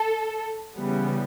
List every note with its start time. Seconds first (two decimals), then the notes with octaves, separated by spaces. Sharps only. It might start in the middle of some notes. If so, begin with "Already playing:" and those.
Already playing: A4
0.76 C#3 E3 G3 B3